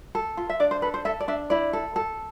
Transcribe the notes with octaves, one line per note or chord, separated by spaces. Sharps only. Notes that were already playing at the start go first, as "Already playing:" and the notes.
A4
F4
E5
D4 D5
C5
A4 B4
C5
A4 E5
D5
D4 E5
E4 D5
A4
A4